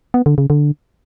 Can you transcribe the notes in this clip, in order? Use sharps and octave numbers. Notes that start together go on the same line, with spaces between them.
B3
D3
C#3
D3